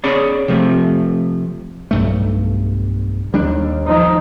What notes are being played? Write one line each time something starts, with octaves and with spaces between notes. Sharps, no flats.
C#4 G#4 C#5 D5 B5
C3 F3 A3
B1 G2 A3
D#2 G3 D4
F3 D#4